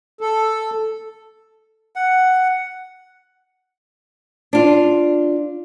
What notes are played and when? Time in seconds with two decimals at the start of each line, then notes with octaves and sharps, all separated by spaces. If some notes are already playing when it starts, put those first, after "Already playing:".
0.21 A4
1.96 F#5
4.53 D4 F4